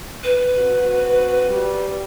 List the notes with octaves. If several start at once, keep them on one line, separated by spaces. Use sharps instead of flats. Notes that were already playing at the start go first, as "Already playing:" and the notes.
B4
C4 F#4
G3